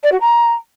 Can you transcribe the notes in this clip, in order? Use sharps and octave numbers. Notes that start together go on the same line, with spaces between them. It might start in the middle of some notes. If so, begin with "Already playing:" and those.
D5
F#4
A#5